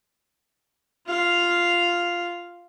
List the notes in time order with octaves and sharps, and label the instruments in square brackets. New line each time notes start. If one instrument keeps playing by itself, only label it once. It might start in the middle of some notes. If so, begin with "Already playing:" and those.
[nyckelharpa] F4 F5